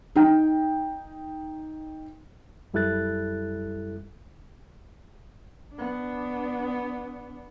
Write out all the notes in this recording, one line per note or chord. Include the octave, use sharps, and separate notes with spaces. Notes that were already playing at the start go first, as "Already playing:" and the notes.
D#4 G5
F#2 G3 E4 A4 F#6 A6
B3 D4